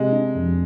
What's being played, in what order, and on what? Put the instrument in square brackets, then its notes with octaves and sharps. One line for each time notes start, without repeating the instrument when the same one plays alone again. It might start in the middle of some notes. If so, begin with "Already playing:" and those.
Already playing: [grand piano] C3 [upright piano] G#3
[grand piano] D4
F2